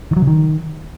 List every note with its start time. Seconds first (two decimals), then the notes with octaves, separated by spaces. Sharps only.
0.11 D#3
0.16 F#3
0.22 C#3
0.27 D#3